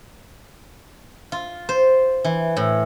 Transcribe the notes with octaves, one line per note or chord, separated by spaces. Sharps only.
F4
C5
E3
A2